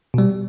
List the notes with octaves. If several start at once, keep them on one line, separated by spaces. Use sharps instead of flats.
B2 G3